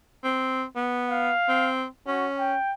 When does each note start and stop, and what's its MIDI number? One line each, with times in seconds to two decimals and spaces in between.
0.24 0.64 60
0.76 1.32 59
1.10 1.70 77
1.49 1.85 60
2.07 2.55 61
2.07 2.27 66
2.38 2.74 79